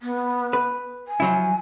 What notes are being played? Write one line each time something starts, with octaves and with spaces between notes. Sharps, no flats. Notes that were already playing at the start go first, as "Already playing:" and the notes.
B3
B4
G#5
F3 F#3 E4